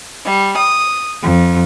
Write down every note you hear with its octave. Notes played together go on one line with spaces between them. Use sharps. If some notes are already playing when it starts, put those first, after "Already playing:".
G3
D#6
F2